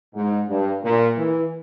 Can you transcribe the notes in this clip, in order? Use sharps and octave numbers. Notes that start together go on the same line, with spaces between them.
G#2
G2
A#2
E3